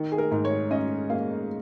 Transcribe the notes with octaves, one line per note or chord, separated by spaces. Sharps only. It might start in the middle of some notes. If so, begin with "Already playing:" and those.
Already playing: D#3
G#4
A#4
G#2
C#5
C#4 D#5
A#3 F5